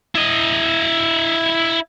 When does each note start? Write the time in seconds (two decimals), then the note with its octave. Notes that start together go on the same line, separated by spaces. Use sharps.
0.15 E4 D#5